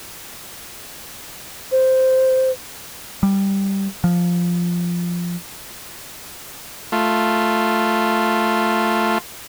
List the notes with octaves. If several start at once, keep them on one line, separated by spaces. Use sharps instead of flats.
C5
G3
F3
A3 F4